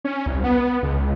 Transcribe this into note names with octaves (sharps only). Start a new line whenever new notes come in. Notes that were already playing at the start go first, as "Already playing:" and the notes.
C#4
C2
B3
C#2